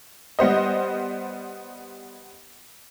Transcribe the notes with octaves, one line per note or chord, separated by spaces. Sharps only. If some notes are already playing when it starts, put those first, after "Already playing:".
G3 B3 C5 D#5